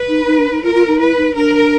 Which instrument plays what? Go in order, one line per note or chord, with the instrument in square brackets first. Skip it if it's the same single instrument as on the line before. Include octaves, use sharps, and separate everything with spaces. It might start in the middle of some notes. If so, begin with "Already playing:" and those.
Already playing: [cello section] B4
[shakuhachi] D#4
D#4
D4
D#4
[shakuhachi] F4 [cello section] A#4
[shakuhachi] F4
D#4
[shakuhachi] E4 [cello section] B4
[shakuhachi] D#4
[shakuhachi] D4 [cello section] A#4